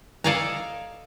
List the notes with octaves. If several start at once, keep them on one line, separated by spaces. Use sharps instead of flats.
A4 D5 D#5 F5 G#5 A#5